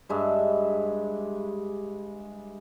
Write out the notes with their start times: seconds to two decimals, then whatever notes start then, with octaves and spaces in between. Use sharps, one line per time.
0.09 G2 G#3 E5